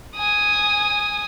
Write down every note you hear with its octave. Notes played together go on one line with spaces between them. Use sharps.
G#5 D#6